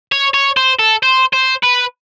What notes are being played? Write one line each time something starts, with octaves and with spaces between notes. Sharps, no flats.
C#5
C#5
C5
A4
C5
C5
B4